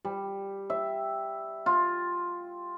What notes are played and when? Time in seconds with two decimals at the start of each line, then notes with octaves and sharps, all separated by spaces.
0.05 G3
0.70 E5
1.66 F4